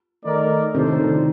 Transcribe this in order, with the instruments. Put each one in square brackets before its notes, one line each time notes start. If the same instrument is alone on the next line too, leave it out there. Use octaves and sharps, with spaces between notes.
[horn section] D#3 A3 D#4 A#4 D5
[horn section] A2 A3 D4 A4 C5 [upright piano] C3 D#3
[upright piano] C3 D#3